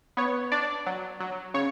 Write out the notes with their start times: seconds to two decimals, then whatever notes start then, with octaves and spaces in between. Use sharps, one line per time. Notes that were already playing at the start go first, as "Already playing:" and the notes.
0.17 B3 C#5
0.52 D4 D5
0.86 F#3
1.20 F#3
1.54 C#3 C#5